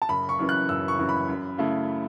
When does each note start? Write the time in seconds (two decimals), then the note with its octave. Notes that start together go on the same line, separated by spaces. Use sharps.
0.02 A5
0.09 F#1 B5
0.29 C#6
0.39 F#2 E3 C#4
0.49 F#6
0.69 F#1 E6
0.88 C#6
0.99 F#2 E3 C#4
1.09 B5
1.28 F#2
1.58 C#3 A3 E4